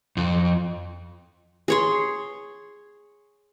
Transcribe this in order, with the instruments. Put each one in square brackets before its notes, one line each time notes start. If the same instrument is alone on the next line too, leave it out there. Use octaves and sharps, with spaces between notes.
[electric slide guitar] F2
[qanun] G#4 C#5 C6